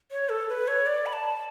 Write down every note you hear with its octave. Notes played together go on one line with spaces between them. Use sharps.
C#5
A4
B4
C#5
D5
B5
A5